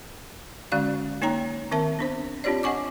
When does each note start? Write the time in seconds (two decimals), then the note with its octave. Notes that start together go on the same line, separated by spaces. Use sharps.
0.72 D3 G#3 C#4 F#4 D5 F5
1.22 A#3 D#4 C#5 G5 A#5
1.71 D#3 C4 A#4 E5 A5
1.99 B3 D4 C5
2.44 C4 D4 F4 G4 C#5 D5
2.63 D#5 F#5 G#5 C#6 D6